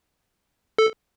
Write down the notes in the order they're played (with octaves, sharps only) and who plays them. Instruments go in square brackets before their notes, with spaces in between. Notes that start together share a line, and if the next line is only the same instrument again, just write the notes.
[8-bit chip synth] A4